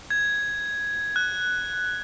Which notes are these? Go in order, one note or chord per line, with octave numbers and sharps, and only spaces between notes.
G#6
F#6